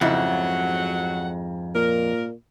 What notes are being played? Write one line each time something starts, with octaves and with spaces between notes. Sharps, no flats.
F2 G#2 C#3 F#3 E4 F#5
A#2 A#4